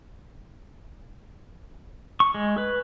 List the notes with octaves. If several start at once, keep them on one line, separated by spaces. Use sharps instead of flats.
C#6
G#3
B4